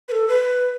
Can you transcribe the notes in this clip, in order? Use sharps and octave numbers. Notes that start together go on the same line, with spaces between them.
B4
A4
B4